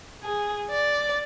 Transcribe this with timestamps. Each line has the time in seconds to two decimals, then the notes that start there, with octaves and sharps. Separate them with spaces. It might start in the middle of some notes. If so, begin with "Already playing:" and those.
0.23 G#4
0.70 D5